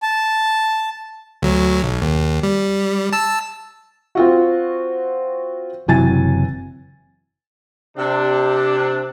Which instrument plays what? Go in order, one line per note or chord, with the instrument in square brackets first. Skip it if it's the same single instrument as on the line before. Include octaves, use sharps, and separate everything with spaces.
[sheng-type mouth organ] A5
[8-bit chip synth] D2 F#3
B1
D#2
G3
A5 E6
[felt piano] C4 F4 F#4
[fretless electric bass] F#1 C3 F#3 [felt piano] E3 G#5 A6
[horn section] C3 D4